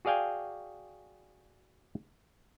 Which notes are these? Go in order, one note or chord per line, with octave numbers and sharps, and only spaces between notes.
F#4 G#4 D5 F5 G5 G#5